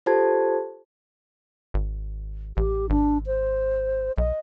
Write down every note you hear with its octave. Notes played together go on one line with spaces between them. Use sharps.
F4 G4 A4 C5 A5 G#6
G#1
A1 G4
G#1 D4
C5
B1 D#5